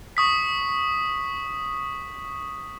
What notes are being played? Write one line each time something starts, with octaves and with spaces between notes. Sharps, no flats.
C#6 D#6 B6